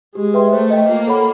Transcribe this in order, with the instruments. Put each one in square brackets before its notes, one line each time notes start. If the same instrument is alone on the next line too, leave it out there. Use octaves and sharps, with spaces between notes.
[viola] G#3 [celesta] G4
[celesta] B4 E5 G5 C6
[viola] A3 [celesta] C5
[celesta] D#5 G5
[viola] A#3 [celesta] F4
[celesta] A4 C#5 F#5 B5